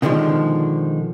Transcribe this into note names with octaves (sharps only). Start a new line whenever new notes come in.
B2 D3 D#3 F3 G#3